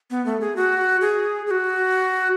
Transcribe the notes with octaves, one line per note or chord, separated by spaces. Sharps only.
B3
A3
G#4
F#4
G#4
G#4
F#4